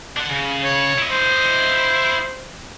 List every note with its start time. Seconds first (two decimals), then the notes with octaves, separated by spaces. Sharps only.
0.17 D4 F#5
0.30 C#3
0.64 C#5
0.99 E4 D#5
1.11 C5